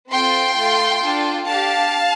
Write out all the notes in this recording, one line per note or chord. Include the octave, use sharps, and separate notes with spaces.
C4 F4 A4 G5 C6
A3 F4 A4
D4 F4 A4
D4 G4 F5 A5